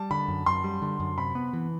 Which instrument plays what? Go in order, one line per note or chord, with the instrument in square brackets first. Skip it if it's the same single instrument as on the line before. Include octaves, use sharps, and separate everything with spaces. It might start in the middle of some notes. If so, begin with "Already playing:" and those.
Already playing: [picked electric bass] G3 [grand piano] A5
[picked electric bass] D3 [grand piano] B5
[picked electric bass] F#2
[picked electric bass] F#2 [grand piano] C6
[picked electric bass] G3
D3
F#2
[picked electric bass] C3 [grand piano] B5
[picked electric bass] B3
E3